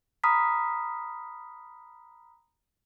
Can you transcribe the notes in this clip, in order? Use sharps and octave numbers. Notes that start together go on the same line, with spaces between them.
A#5 B5 D#6 F6 B6